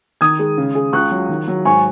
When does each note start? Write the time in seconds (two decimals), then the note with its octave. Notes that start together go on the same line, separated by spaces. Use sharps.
0.21 D#3 D#6 G#6
0.39 G#3
0.58 C#3
0.75 G#4
0.93 C#2 C#6 F#6
1.11 F#3
1.29 D#3
1.48 F#3
1.65 G#2 G#5 C#6